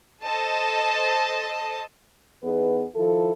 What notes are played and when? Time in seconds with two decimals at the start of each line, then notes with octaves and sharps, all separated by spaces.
0.23 A4 C5 D#5 A5
2.43 E2 B3 D#4 G#4 B4
2.95 D#3 F3 E4 A4